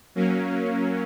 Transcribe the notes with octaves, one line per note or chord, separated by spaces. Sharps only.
F#3 A#3 C#4